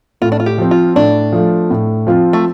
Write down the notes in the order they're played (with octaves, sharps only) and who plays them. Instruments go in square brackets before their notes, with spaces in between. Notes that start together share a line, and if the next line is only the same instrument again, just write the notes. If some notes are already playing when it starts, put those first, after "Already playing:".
[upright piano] A2 [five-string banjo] F4
[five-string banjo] D4
F4
G4
[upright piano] F3 C4
[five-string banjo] F4
[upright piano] A2 [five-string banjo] D4
[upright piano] F3 A3 F4
A2
F3 C4 F4
[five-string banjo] A3